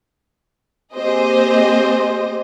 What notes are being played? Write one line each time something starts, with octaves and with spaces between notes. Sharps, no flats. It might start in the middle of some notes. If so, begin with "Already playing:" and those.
A#3 C4 G4 G#4 C5 D#5